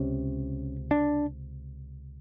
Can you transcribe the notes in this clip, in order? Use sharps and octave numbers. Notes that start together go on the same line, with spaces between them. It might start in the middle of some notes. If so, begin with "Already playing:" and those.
Already playing: C#2 C3 C#4
D4